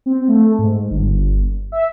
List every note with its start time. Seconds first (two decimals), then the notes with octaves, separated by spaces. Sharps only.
0.06 C4
0.28 A3
0.58 G#2
0.90 G1
1.72 E5